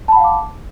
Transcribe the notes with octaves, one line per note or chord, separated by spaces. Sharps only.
F5 F#5 A5 B5 D6